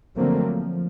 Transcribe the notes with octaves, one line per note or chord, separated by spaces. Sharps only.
D3 F3 F#3 A3 A#3 C4
F3